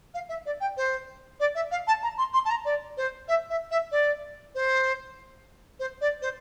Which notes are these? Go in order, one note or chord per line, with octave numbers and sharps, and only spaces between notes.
F5
E5
D5
G5
C5
D5
E5
F5
A5
A#5
C6
C6
A5
A#5
D5
C5
E5
E5
E5
D5
C5
C5
D5
C5